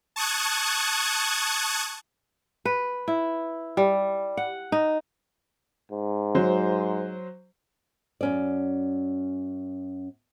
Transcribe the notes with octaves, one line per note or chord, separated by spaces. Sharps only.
A5 C#6 D#6 F#6 G#6
B4
E4
G3
F#5
D#4
G#2
F#3 C5
F#2 C#4 D5